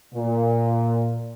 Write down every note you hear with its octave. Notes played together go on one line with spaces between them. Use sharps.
A#2